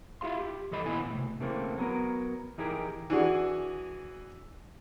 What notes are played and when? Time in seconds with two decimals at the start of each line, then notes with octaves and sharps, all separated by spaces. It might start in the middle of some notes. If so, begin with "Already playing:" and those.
0.21 E4 F4 G4 F5 C6
0.40 G4
0.71 G2 E3 A4 D#5 B5
0.85 D#2 A#2 B3 E4 G#5 B5
1.11 A2 C3
1.40 C#3 E3 A3 A#3 C4
1.78 F#3 B3 A#4
2.58 E3 D#4 G4 G#4 A#4
3.10 E3 D4 F#4 G#4